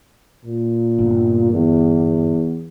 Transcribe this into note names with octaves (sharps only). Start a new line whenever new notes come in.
A#2
G1
E2